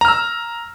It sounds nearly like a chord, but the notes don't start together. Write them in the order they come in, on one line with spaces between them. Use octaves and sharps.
A#5 F6 E6